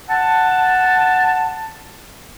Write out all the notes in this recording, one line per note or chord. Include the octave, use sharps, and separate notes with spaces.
F#5 A5